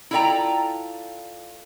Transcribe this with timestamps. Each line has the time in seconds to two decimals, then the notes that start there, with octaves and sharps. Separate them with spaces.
0.11 E4 F4 A4 D5 G5 A#5